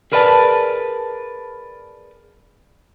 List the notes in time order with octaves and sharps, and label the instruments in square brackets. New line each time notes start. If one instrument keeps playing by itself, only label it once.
[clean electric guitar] G#4 A#4 B4 D5 E5 A5